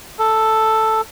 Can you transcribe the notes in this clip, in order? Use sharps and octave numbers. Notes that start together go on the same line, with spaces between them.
A4